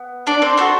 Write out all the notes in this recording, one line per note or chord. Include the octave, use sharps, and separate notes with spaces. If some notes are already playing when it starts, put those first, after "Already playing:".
Already playing: B3
D4 D5
C4 C5
A3 C4 F#4 A4 C5